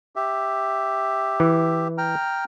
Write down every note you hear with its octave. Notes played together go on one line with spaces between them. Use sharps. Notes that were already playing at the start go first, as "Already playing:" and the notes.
G4 E5
E3
G5 A#5 F6